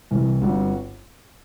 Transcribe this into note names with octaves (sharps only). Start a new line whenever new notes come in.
C2 C3 E3
G1 G2 D3 G3 C4 F#4